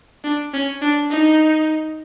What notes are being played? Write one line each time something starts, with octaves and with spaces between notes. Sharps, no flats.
D4
C#4
D4
D#4